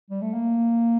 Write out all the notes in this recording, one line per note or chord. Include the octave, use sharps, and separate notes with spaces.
G3
A3
A#3